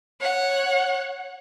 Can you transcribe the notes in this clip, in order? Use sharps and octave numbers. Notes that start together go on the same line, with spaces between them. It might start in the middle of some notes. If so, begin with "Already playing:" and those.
C#5 F#5